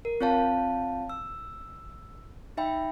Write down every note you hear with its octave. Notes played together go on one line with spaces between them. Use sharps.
A#4
C4 F4 C#5 F5 A5
E6
D#4 E5 G5 B5